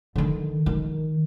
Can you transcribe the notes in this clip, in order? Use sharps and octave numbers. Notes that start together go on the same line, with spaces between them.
D3 D#3
D#3